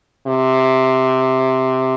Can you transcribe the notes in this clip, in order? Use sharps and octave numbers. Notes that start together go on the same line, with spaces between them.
C3